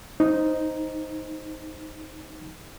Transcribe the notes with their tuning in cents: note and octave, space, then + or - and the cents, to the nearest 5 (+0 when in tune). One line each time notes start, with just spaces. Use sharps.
D#4 +0 C5 +0